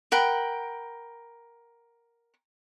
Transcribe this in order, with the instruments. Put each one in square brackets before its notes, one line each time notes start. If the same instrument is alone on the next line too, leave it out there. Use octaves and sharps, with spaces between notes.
[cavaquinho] A#4 F#5 G5 B5